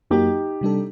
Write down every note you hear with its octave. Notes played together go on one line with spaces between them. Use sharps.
F#2 F#3 A#3 D#4 F#4 G4
C3 G3 D4 A4